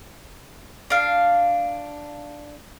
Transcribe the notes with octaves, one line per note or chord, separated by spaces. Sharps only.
D4 F5